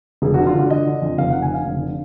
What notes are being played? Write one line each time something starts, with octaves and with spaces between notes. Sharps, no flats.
F1 G#4
D3 F#4
F4
D3 F#4
D3 D#5
D3
F2
F1 F5
F1 F#5
G#5
D3 F5
F1
D3